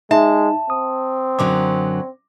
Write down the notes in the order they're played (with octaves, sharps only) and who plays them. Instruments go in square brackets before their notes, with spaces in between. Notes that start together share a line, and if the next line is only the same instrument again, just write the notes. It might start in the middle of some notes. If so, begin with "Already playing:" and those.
[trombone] G#3 [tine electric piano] D#4 [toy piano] E5 [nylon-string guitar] A5
[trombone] C4 [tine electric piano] D#6
[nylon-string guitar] F#2 D3 F#3 [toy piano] D6